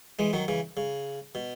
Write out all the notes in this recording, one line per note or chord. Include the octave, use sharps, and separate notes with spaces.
E3 G#3
D#3 F#3
C#3 E3
C#3
B2